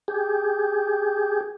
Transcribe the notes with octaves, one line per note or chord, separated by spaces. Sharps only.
G4 G#4